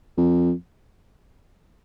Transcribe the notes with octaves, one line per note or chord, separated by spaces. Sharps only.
F2